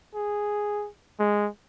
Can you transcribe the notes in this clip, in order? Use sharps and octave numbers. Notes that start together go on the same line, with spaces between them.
G#4
G#3